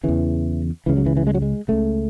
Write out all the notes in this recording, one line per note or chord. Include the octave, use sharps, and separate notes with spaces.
E2 C#3 E3
C#2 C#3 E3
F#3
E3
E3
G#3
F#3
G#3
C#2 C#3 A3